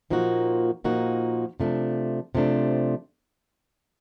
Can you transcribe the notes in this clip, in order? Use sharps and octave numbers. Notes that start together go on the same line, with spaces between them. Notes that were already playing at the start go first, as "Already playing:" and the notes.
A#2 F3 A#3 D#4 F#4
A#2 F3 A#3 D#4 F#4
C3 F3 A3 D4
C3 F3 A3 D4